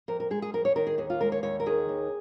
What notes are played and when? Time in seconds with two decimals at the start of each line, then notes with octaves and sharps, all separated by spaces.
0.08 F2 A#4
0.20 A#4
0.31 G#3 G#4
0.42 G#4
0.54 F2 A#4
0.65 C#5
0.76 D#3 A#4
0.87 G#4
0.98 D#2 G#4
1.10 F4
1.21 G#3 A#4
1.32 C#5
1.43 D#2 C#5
1.60 A#4
1.66 D#3 G#4
1.89 D#2